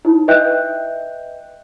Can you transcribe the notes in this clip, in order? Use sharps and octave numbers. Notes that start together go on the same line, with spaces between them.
D#4 E4
B4 D#5 E5 G5 F#6 G6